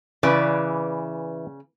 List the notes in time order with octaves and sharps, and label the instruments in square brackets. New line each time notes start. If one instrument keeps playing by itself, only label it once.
[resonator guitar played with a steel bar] C#3 D5 [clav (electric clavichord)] E3 B4